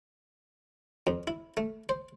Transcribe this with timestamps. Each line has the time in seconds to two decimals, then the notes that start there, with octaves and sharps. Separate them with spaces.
1.07 F2
1.27 E4
1.57 A3
1.89 C5